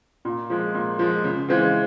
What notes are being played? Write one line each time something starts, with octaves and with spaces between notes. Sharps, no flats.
A#2
F3 G#3
A#2
F3 G#3
C#3
E3 G#3 C4 F4